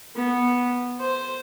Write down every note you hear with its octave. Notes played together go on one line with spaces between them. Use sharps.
B3
C5